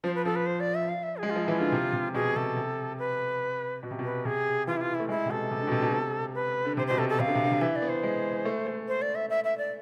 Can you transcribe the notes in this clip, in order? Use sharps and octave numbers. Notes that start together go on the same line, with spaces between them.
F3 C5
B4
F3 A4
B4
C5
D5
E5
F5
E5
G#4
G#3
F4
F3
E3 E4
D3 F4
C3
C3
B2 G#4
C3 A4
C3
B4
B2
C3
B2
B4
C3 G#4
E3 F4
E4
F4
E4
A3
G#3 E4
C3
B2 A4
C3
D3
B2
C3
B2
C3
B4
D3
C3 C5
B2 C5
C3 A4
A4
C3 F5
D3
C3
D3
C3
E3 E5
D5
B3
C5
G#3
A3
A3
C5
D5
E5
E5
E5
D5